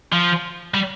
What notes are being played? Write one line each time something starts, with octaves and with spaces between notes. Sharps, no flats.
F3
G3